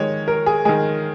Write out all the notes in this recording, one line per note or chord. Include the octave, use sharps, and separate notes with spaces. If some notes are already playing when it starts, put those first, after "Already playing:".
Already playing: D#3 G#3 C#5
A#4
G#4
D#3 G#3 G#4